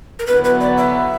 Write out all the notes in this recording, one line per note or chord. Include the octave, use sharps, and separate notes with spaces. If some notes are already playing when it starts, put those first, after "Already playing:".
A#4
D3 F#3 B3 E4 B4
B4
D5
E5